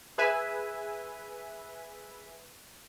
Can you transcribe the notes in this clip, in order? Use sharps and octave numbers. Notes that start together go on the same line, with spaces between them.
G#4 B4 E5 G#5